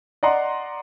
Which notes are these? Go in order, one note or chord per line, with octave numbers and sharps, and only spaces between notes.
D5 D#5 F#5 A#5 C6